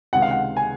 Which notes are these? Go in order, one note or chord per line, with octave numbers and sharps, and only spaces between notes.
C#2 C3 D#3 G#3 F#5
F5
F#5
G#5